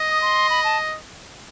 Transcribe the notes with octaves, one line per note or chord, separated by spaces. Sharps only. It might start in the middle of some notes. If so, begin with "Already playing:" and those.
Already playing: D#5
D#6
C6
B5
A5